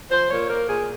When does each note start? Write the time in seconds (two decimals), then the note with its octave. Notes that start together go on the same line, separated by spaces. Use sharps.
0.11 F3 C5
0.31 A#2 C#5
0.49 A#3 A#4
0.69 A#2 G#4